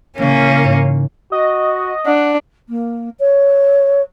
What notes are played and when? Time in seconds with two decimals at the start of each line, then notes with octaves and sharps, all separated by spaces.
0.18 A1 C#3 A#3 C#4
0.64 G#2
1.32 F#4 D#5
2.06 D4 F#5
2.69 A#3
3.19 C#5